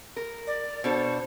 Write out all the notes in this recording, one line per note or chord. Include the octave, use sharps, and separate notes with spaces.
A#4
D5
B2 D4 A4 C5